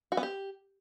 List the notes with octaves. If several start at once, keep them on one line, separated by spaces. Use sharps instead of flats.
F#4
B3
G4